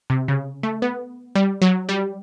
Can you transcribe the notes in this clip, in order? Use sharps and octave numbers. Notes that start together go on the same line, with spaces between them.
C3
C#3
A3
B3
G3
F#3
G3